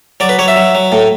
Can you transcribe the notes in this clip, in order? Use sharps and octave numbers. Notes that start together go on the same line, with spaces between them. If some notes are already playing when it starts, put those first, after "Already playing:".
F#3 D5
B4
F#3 C#5
E5
F#3
F#3
A2